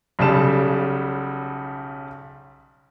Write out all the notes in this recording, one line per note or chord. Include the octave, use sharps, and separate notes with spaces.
B1 C#3 G3 A5 E7